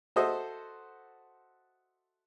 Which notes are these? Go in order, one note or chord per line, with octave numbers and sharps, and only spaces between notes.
F#4 A4 C5 D#5 E5